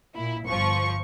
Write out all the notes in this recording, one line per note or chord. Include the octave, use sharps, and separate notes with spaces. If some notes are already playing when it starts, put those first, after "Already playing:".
A#2 E4
G1 F3 C#6